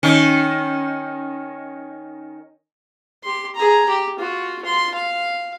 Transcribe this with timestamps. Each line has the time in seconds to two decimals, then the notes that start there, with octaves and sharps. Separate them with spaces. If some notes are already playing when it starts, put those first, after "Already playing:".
0.03 D#3 C#4
3.24 G4 C6
3.56 G#4 A#5
3.89 G4
4.20 F4 F#4
4.62 F4 C6
4.95 F5